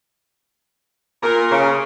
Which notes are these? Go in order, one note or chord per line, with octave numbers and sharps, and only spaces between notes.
A#2 A#4
C#3